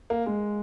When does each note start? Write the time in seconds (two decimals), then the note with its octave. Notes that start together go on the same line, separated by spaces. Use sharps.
0.10 A#3
0.26 G#3